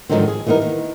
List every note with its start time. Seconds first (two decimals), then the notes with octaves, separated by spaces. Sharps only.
0.09 G#2 D3 D#3 F3 F#3 C4
0.28 G#4
0.46 E3 G3 B3 D#4 A#4
0.62 D#3 B3